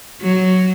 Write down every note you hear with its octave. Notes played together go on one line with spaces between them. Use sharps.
F#3